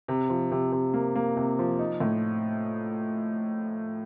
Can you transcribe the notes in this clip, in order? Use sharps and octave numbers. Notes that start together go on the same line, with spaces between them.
C3
F3
C3
C3
A#3
A#3
C3
F3
D#4
A2